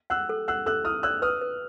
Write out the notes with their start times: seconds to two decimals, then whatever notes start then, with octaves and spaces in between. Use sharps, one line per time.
0.10 F#5 E6 F#6
0.29 A4
0.48 F#5 E6 F#6
0.66 A4 E6 F#6
0.84 E4 D#6 F6
1.03 D5 E6 F#6
1.22 B4 D#6 F6
1.41 B4